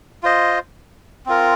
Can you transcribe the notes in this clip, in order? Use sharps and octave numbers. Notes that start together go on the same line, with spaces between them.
F4 C5 D#5
C4 F4 A#4